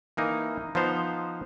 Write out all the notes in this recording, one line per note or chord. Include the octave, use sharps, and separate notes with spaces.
E3 A#3 D#4
F3 B3 D#4 C5 F5